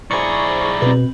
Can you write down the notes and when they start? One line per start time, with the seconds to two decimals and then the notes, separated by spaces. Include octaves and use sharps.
0.11 B1 E4 G#4 C5 D5 A#5 C#6
0.82 B2 C4 B4